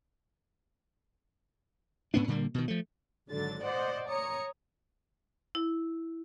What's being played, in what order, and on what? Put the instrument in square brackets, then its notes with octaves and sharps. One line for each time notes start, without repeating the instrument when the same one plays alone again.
[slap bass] G#2 B3 C#4 D4
A#2 D3 G3 A#3
B2 D#3
F3 A3
[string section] G#1 D3 F#3 A6
C5 D5 D#5 F#5
C#5 A#5 D#6 C#7
[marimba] E4